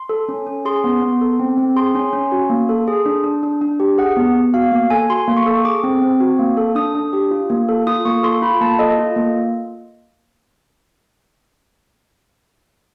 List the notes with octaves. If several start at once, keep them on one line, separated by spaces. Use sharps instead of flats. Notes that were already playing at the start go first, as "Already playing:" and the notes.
Already playing: C6
A4
C#4
C#4
G#4 C6
B3
B3
A4
C4
C4
G#4 C6
C#4
C#4
F#4
A#3
A4
G#4
D4
D4
D4
D4
G4
G#4 F#5
B3
B3
F#4 F5
A#3
A4 G#5
F#4 C6
A#3
C#6
A4
G#4 D6
C4
C4
F#4
A#3
A4
D4 D#6
D4
G4
F4
A#3
A4
F4 D#6
A#3 C#6
A4 C6
F4 B5
A#3 A5
A4 D#5
F4
A#3